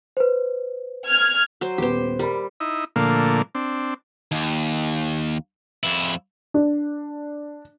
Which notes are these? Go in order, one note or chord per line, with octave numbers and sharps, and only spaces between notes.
B4 C5
F6 G#6
F#3 C5
D#1 B3 G4 C5
G3 A#4 B5
D#4 E4
A#2 D3 F3 A3 A#3
C4 D4
D#2
F2 E4
D4